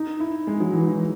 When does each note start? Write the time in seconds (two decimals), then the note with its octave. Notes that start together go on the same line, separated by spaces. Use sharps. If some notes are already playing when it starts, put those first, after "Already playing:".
Already playing: D#4
0.20 E4
0.47 G#3
0.60 F#3
0.73 E3
0.87 F#3